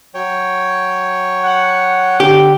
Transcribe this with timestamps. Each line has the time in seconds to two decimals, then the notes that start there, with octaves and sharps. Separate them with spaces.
0.14 F#3 C#5 G5
1.43 F#5
2.20 D3 G4